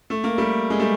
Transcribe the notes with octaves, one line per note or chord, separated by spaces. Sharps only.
A3
A#3
G3 A3
G#3
G3 A3